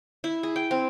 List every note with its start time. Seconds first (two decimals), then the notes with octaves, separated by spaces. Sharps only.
0.24 E4
0.43 G#4
0.56 G5
0.71 C4